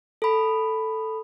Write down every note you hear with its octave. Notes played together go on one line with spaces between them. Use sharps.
A4 B5